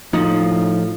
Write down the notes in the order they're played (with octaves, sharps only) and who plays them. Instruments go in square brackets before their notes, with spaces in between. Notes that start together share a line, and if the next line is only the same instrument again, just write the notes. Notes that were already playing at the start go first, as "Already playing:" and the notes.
[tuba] A2 [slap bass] F3 [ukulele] D#4